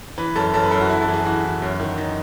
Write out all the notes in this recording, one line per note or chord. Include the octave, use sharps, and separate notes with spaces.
E3 B4
F#2 A4
F#2 A4
B4
F#2 A4
F#4
F#2 E4
A4
E3
G#4
E3 F#4
E3
F#2
D#3
F#2 D#4